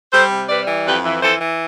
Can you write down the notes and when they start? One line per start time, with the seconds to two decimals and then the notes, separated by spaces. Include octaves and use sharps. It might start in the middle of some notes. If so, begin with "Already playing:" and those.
0.11 G3 A4 C5
0.30 C3
0.48 G3 B4 D5
0.67 E3
0.85 F2 G4 B4
1.03 E3
1.22 E3 A4 C5
1.41 E3